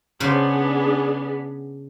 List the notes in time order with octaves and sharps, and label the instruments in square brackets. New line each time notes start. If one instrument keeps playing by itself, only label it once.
[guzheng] C#3 B4 C5 [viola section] B3 D4 G#4